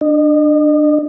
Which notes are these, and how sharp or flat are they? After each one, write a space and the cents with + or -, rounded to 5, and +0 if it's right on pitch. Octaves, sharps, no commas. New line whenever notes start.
D4 +20 D#5 -35